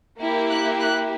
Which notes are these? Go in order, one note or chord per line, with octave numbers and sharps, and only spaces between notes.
A#3 E4 G4
F#6
F#6